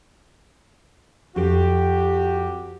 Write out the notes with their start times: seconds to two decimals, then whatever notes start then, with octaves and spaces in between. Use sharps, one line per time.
1.36 F2 F#4 G4